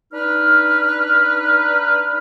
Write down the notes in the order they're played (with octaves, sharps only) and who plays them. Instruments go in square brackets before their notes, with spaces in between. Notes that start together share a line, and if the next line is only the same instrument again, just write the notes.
[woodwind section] D4 D#4 B4 F6